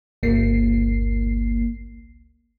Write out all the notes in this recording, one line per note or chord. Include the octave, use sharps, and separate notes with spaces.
G1 C#2 A#3 C7